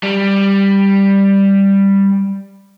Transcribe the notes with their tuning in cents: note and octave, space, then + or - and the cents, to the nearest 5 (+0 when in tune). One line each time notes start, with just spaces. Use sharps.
G3 +5